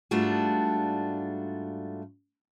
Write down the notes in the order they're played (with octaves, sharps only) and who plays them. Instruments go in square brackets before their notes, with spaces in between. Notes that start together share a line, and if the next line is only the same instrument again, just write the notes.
[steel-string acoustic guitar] G#2 G3 A3 D4 F4 F#4